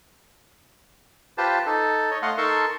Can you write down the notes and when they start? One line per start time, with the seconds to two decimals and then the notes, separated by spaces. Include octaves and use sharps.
1.38 F4 G4 B4 C5 A5
1.66 D#4 A4
2.11 C#5 D#5
2.22 A3 D#5 F5 F#5 C6
2.38 D#4 A4 A#4 A5 C6 C#6